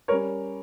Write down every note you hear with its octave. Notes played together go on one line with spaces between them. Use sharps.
G3 C#4 A#4 C#5